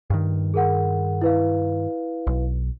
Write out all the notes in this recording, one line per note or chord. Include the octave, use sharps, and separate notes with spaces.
G2 D#3
G#4 A#4 F#5
E4 B4 F5
B1